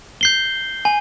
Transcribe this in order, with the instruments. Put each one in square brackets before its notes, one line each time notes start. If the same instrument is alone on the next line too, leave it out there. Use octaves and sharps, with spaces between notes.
[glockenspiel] G6 C7 G7
G#5